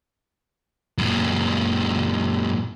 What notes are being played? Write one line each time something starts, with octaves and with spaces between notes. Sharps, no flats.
F#2 A#2